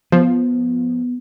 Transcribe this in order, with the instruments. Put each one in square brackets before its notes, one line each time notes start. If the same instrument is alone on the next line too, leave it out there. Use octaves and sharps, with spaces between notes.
[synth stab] F3 [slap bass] B3